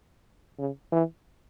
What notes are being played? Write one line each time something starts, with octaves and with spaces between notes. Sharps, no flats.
C#3
E3